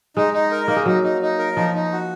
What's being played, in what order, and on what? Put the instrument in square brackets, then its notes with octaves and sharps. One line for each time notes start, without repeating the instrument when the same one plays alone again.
[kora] G#3 [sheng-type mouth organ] D#4
[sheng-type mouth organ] D#4
A#4
[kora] A#3 [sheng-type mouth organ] D#4
[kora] G#3
[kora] F#3 [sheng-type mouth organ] D#4
[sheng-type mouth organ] D#4
D#4
A#4
[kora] F3 [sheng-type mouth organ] D#4
[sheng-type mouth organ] D#4
F#4